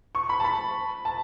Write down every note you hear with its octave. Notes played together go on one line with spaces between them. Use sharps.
C#6
B5
A5
B5
A5